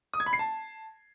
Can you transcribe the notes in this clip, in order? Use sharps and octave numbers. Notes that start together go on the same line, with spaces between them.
D#6
G#6
B5
C7
A5